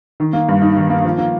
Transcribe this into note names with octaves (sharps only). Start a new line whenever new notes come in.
D#3
A#3
G2
D#4
D#3
A#3
F3
A#3